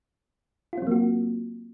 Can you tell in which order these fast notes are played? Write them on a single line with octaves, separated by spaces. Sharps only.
F4 C4 F#3 A#3 F#4